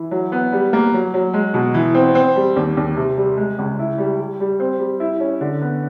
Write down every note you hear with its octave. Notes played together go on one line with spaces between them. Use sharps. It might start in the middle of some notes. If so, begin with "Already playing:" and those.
Already playing: E3
F#3
B3
G3
A#3
F#3
F#3
G#3
B2
E3
C4
C4
G3
D#2
D#2
C3
G3
G#3
C#2
E4
G3
G3
G3
C4
G3
E4
C#4
D3
B3